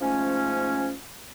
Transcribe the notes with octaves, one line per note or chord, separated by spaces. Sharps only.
G#2 F3 A3 C#4